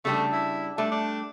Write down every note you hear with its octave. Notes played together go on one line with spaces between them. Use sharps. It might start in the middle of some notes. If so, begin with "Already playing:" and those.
C#3 G3 A3 D4
E4
G3 A3 D4
D4